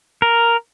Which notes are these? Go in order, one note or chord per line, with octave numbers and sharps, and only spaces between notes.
A#4